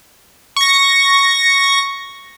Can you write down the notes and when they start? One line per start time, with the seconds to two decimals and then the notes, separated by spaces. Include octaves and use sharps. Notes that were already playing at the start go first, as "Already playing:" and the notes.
0.56 C#6 A#6